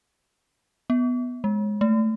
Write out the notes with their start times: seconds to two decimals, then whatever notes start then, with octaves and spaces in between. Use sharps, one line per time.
0.90 B3
1.44 G#3
1.81 A3